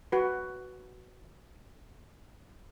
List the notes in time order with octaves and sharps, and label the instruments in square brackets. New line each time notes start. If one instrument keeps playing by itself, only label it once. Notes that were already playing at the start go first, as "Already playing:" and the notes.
[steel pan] F#4 B4